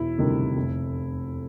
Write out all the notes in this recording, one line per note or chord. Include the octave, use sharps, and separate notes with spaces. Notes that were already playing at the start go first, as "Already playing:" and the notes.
Already playing: E1 E4
D2 C3 D#3 G3
F1